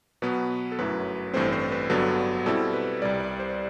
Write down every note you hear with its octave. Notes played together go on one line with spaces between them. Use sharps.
B2 F#3 B3 B4
A4
G1 F#2 F#3 A3 E4 B4
A1 G2 E3 A3 C4 C5
C5
B4
G1 G2 D3 F#3 B3 A4
B2 G3 C4 E4 A4
B4
C2 C3 G3 D5
D5
C5